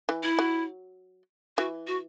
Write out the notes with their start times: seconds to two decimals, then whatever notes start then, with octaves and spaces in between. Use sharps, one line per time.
0.09 E3
0.23 E4
0.39 F#3
1.57 E3 F#4
1.87 F#4